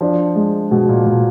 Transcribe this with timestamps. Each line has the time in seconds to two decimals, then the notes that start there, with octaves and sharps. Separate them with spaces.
0.01 F3 D4
0.36 G#3
0.71 B2 G#3
0.89 A#2
1.06 A#2 G#3